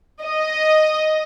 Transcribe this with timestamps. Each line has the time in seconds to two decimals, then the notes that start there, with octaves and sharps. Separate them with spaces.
0.23 D#5